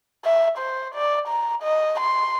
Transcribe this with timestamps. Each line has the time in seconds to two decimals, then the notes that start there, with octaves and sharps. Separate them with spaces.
0.25 E5
0.58 C5
0.95 D5
1.28 A#5
1.63 D#5
2.00 C6